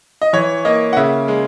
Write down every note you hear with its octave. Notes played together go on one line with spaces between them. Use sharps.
D#5
E3 C#5
A#3 D#5
F#5
C#3 E5
G#3